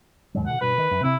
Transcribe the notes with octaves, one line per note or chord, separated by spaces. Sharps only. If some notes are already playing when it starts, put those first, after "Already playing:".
D#2 G#2 F#3
B2 D3 F#5
G2 B2 B4
D#3
F#2
C3 C4 E4